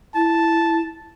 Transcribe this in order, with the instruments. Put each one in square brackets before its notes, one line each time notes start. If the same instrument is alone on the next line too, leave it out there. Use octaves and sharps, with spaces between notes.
[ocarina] E4 [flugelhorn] A5